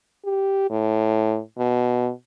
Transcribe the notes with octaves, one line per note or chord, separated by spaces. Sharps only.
G4
A2
B2